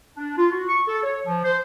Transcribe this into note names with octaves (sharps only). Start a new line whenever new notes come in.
D4
F4
F#4
C#6
A4
C#5
F3
C5